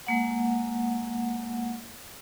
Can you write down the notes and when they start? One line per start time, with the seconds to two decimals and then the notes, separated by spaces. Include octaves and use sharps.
0.07 G#3 A#3 F#5